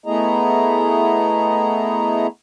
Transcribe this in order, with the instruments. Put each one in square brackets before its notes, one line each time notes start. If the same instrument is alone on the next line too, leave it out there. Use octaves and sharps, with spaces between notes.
[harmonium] A3 B3 E4 G#4 D#5 A#5